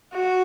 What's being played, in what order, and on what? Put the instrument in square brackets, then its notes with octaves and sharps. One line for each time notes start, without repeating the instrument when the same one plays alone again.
[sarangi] F#4